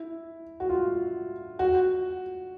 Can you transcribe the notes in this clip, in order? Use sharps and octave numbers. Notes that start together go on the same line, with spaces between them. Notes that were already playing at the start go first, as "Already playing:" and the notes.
Already playing: E4
F#4
F4
F#4